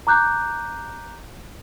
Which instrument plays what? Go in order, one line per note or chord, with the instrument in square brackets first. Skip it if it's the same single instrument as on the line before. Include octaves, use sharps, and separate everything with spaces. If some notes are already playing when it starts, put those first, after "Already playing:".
[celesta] A#5 D6 F#6 G6